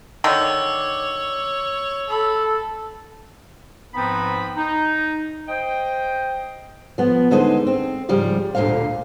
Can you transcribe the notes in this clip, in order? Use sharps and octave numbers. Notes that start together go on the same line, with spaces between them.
D3 D#3 D4 C#5 E6
A4 B5
G#2 F3 B3 C4 B4 B5
D#4
C5 D#5 G5
F3 B3
D#2 D3 G#3 D#4 C5
C4
G#2 C#3 F3 G3
D2 A#2 D3 F3 C5 F5